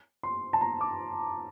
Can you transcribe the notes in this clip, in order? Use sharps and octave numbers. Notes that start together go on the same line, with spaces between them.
C6
A5
A#5
D6